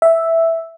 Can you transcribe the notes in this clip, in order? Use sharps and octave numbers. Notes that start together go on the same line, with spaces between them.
E5